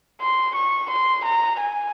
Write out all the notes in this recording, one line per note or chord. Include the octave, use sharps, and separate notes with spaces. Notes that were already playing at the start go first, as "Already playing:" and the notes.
C6
C#6
C6
A#5
G#5